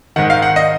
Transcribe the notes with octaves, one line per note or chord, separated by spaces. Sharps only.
G#2 D#3 F#5
F5
F#5
D#5